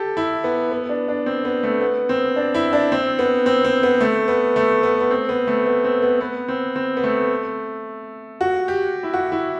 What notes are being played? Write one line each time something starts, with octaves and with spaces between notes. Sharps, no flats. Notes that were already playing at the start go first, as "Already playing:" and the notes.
Already playing: G4 A4
E4
B3
B3
D4
D4
C4
B3
A3
B3
C4
D4
E4
D4
C4
B3
C4
C4
B3
A3
B3
A3
B3
B3
C4
B3
A3
B3
C4
B3
B3
C4
C4
B3
A3
F#4
G4
E4
F#4
E4